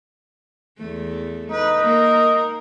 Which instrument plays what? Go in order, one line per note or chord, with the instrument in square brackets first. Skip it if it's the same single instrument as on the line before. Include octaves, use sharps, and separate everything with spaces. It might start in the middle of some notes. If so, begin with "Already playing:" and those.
[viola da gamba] E2 A3
[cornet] D#4 [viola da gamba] B4
[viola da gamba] A#3 A#4